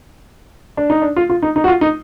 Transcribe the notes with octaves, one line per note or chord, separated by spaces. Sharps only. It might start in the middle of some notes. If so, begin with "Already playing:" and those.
D4
D#4
D4
F4
F4
D#4
D#4
F#4
F4
D#4